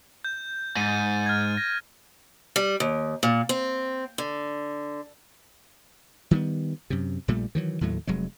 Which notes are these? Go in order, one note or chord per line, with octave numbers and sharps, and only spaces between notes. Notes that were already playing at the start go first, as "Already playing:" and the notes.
G6
G#2 A6 D#7
F6 G#6
A#6
G3
D#2
A#2
C4
D3
D#3 G3 A3 B3
F#2 C3
A#1 A#2 G3 A3
D#3 E3 F#3
D#2 A2 F#3 A3
F1 F#3 G#3